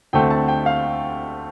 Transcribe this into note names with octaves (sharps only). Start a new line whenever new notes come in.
D2 D3 A3 C4 G5
A5
G5
F5